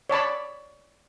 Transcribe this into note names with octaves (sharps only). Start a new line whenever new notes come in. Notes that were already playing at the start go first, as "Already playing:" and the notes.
C#5 D5 A5 B5